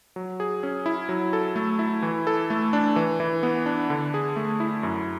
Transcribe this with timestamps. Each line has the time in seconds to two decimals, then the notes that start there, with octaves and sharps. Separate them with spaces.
0.16 F#3
0.40 G#4
0.63 C#4
0.86 E4
1.09 F#3
1.33 A4
1.56 A3
1.79 E4
2.02 E3
2.27 A4
2.50 A3
2.73 D4
2.96 E3
3.20 E3
3.43 B3
3.66 D4
3.90 D3
4.14 G#4
4.36 A3
4.60 E4
4.83 F#2